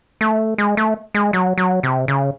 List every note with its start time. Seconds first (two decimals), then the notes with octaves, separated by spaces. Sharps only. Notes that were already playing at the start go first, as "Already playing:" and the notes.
0.21 A3
0.58 G#3
0.77 A3
1.15 G#3
1.33 F#3
1.58 F#3
1.83 C3
2.08 C#3